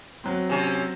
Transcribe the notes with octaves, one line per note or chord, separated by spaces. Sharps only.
F#3 C4
C3 C#4